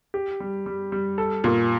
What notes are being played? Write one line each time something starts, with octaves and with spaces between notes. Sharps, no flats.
G4
G3
G3
G3
A4
A#2